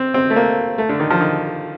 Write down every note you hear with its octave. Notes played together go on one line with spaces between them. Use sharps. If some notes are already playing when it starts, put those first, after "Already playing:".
Already playing: C4
C4
A3
A#3
A3
D3
D#3
F3
D#3